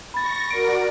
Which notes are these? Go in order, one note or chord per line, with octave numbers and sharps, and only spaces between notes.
B5 C#6 A6 A#6
F#4 A#4 D5 D7